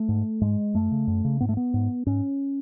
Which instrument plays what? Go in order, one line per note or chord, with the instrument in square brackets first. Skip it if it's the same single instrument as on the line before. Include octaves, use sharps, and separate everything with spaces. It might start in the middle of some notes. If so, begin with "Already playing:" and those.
Already playing: [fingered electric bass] A3
G#2
G#2 G#3
F#2 A3
C#3
F#2
C#3
G#2 B3
A3
B3
G#2
G#2 C#4